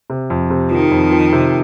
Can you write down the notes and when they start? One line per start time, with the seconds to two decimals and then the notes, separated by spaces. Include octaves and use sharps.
0.10 C3
0.30 F2
0.50 C3
0.71 D#3 F3
0.91 F2
1.11 F3
1.32 C3